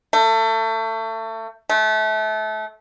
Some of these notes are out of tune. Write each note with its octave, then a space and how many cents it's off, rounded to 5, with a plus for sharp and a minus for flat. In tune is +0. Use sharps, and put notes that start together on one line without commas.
A3 +30
A3 -25